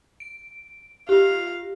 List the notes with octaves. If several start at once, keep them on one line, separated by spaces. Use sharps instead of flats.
D7
F4 G4 F5